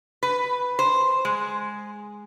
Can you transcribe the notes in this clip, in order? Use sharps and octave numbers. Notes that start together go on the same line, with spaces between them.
B4
C5
G#3